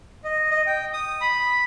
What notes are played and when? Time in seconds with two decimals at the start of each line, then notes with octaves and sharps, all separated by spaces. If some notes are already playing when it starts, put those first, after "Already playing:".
0.24 D#5
0.51 D#5
0.67 G5
0.93 D#6
1.21 B5